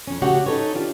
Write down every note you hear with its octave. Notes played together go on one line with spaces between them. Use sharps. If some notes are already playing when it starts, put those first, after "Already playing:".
F2 C#4
C#3 A3 F#4 G4 C#5 F#5
C#4 D#4 A4 B4 C#5
D4 F4 G4